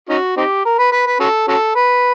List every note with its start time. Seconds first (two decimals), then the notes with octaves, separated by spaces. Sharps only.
0.09 C#4 D#4 F#4
0.37 C4 D#4 G4
0.65 A#4
0.79 B4
0.92 B4
1.06 B4
1.20 C#4 F#4 A4
1.48 C#4 F#4 A4
1.76 B4